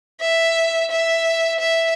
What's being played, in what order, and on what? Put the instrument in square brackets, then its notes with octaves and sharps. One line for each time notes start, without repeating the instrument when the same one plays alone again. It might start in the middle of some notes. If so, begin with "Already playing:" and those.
[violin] E5
E5
E5